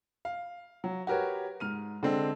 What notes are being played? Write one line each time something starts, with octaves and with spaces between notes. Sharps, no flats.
F5
F#3
F#4 G4 A#4 B4 C#5
G#2 F6 D#7
D3 G#3 C4 D4